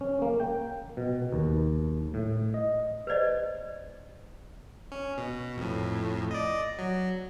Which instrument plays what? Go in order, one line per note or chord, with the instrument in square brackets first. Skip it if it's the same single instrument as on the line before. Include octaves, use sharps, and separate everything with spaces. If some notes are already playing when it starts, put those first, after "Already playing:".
[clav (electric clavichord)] C#4
A#3
G5
B2
D#2
A2
D#5
[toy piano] B4 C5 D5 D#5
[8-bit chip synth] C#4
B2
F2 A2
D5 D#5
F#3